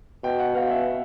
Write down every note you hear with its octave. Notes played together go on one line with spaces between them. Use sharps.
B2 G5
F#5
B2 F5
E5